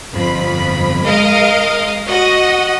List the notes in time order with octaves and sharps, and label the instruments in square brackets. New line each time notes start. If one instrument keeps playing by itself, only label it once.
[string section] G1 F2 B5
G#3 A#4 D#5 F5
F#4 D#5 F#5